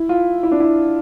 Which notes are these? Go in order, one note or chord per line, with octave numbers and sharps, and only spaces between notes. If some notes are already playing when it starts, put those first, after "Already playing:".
Already playing: E4
F4
E4
D4
E4